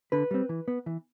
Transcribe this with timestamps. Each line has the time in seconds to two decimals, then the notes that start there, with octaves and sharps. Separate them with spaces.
0.12 D3 B4
0.31 G3 C4
0.49 E3
0.68 B3
0.86 E3